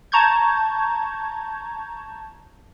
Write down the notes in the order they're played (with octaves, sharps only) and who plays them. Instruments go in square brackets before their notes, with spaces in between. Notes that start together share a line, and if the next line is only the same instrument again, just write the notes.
[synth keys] A5 A#5 C#6 G6 G#6